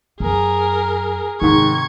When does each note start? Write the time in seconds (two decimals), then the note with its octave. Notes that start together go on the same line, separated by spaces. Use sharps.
0.20 F#2 G#4 A#4
1.41 G#2 C3 D#3 C#6 G#6